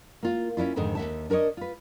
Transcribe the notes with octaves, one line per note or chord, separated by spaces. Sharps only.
A#3 F4
C#4 D4 E4 F4
F2 G#2 D3 D#3
D#2 E5 A5
D4 A#4 C5 C#5 D#5
F4 B4